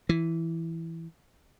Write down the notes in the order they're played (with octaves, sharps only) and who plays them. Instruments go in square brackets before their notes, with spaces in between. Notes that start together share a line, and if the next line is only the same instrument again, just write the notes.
[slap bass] E3